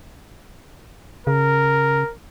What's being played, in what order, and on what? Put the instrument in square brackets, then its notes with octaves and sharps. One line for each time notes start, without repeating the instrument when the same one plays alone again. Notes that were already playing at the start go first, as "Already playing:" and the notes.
[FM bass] C#3 [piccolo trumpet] A#4